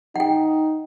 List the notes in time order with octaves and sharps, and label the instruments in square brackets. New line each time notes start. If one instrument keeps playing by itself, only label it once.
[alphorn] D#4 [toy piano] F#5 G5